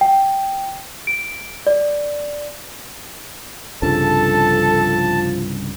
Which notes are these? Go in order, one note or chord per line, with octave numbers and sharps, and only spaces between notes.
G5
D7
D5
C2 G2 C#3 F3 A4 A5